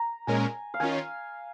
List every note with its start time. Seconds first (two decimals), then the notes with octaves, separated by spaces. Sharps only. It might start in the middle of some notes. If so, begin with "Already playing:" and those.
Already playing: A#5
0.27 A#2 G#3 C#4 A#4 G#5
0.74 F5
0.80 D#3 C#4 F4 G#5